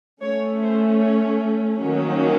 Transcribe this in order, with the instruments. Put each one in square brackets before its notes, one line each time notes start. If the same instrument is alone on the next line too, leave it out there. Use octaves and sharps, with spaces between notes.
[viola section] A3 C#4 C#5
C5
C#5
D#3 F#3 A#3 C#4